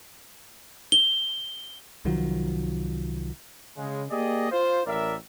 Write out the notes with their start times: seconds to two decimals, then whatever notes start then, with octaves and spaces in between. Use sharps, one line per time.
0.92 G7
2.05 C2 D#3 F3 F#3
3.77 C#3 G#3
4.11 A#3 G4 G#4 D5 D#5
4.51 F4 C5
4.87 A1 A2 A#4 D5 E5